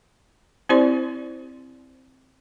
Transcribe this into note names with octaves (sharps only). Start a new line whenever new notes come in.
C4 E4 G4 C5 D5 C6